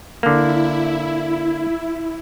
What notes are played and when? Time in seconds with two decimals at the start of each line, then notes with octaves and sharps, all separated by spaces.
0.23 D3 A#3 E4